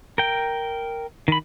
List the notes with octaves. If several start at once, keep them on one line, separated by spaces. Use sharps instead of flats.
A#4 G5
D#3 B5